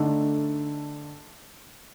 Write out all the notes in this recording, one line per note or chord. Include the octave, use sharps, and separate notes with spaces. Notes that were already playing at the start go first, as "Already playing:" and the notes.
Already playing: D3 A3 D#4 A4